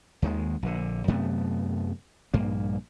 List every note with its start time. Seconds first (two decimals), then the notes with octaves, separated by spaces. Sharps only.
0.22 D#2 D#3 G#3
0.63 A#1 D3
1.08 F#2 C3 A3 B3
2.34 A#1 G2 A#3